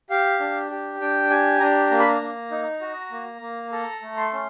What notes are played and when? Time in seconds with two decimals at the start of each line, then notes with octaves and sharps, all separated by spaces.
0.10 G4 F5
0.40 D4
0.70 G4
1.00 D4 G5
1.30 G4 G#5
1.60 D4 A#5
1.91 A#3 A#5
1.99 B5
2.08 A#5
2.22 A#3
2.51 D#4
2.81 F#4
3.11 A#3
3.41 A#3
3.72 A4 A#5
4.02 A3
4.17 C6
4.33 C#4